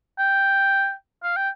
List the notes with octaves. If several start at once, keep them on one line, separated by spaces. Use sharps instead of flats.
G5
F5
G5